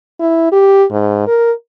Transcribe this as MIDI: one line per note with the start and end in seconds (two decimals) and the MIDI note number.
0.20 0.48 64
0.52 0.84 67
0.92 1.26 44
1.27 1.52 70